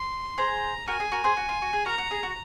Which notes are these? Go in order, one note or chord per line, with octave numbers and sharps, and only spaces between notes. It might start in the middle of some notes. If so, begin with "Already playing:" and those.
Already playing: C6
G#4 C5 A#5
F#4 A#4 G#5
G#4
F#4 A#4
G#4 C5
F#4
F4
F#4
G#4
F#4 A#4 A#5
F#4
G#4
F#4